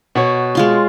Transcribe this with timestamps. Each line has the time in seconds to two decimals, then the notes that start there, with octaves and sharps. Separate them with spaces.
0.15 B2 C#5 F#5
0.55 G#3 F4 C6